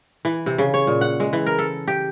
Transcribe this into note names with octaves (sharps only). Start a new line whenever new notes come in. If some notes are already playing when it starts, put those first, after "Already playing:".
E3
C3
C#3
C#5
A#2
F#5
G#3
E3
A#4
A4
G4